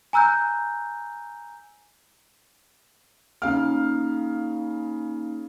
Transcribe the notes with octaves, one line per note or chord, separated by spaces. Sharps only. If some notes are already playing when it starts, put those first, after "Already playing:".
G#5 A#5 E6 F#6 G6
C#3 A#3 D#4 F5 F6